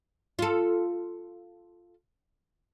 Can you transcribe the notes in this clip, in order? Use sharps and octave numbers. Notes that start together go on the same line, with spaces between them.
F4 A4